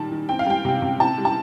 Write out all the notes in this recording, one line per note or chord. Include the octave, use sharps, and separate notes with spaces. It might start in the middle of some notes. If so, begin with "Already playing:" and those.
Already playing: A#2 D#3 G3 A5
D#3
C4 G5
F5
G3 G5
C3
C3
C4 A5
G3
A5